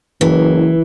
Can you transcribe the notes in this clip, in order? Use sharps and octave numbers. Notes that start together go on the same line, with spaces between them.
F#1 E3